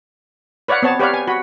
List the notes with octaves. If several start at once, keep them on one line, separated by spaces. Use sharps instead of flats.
B4 C#5 D5 F5 F#5
B3 C4 C#5 A5
G4 B4 C#5 D5 F5
G#5
F#4 B5